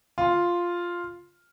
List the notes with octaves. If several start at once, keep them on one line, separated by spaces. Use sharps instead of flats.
F4